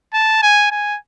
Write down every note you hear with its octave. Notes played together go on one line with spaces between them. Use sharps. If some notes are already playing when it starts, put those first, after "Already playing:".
A5
G#5
G#5